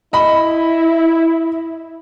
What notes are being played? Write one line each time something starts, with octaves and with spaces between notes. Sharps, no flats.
E4 D#5 B5